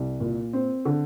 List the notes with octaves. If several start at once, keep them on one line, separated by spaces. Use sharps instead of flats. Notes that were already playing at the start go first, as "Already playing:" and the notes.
Already playing: C2
A#2
C4
D3